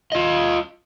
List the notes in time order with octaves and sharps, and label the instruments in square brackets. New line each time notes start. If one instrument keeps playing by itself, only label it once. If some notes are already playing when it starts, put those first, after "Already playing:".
[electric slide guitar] F4 D#5